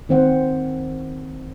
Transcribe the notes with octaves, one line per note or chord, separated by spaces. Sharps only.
D#3 C4 C5 F#5